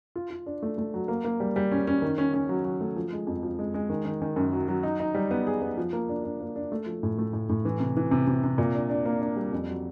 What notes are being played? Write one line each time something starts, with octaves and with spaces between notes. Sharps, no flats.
F4
F4
D4
A3
A3
F#3
A#3
A#3
G3
G3
C#4
C#4
D#3
C#4
C#4
F#3
F#3
A3
F3
G#3
F2
F3
G#3
G#3
D#3
D#3
D#3
F#2
F#3
F#3
D#4
D#4
G3
B3
G#4
B3
F3
A#3
D4
D4
A#3
D4
A3
F3
A2
A3
A2
A2
E3
C3
E3
C3
C3
C3
A#2
D4
D4
A#3
D4
G3
F2
F#3